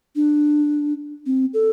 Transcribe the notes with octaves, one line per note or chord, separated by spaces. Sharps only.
D4
C4
A4